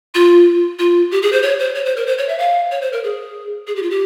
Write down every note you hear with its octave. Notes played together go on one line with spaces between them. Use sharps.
F4
F4
G4
G#4
C5
C#5
C5
C#5
C5
A#4
C5
C#5
E5
F5
C#5
C5
A#4
G#4
G#4
G4
F4
G4